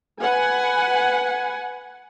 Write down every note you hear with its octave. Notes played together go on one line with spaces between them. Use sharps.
B4 F#5 G#5